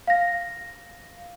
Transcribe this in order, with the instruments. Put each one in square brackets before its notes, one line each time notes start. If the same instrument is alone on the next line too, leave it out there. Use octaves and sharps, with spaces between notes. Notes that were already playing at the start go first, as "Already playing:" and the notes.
[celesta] F5 A#6